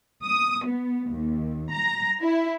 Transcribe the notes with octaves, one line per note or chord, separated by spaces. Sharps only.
D#6
B3
D#2
A#5
E4